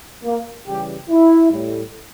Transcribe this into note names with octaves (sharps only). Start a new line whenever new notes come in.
A#3
C#3 E3 G3 G4
E4
A2 G3